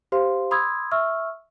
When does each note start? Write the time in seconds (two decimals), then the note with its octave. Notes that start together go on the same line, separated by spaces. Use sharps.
0.12 G4 C5 F5 C6
0.51 B5 C6 D#6 E6 G#6
0.91 E5 C#6 E6 F6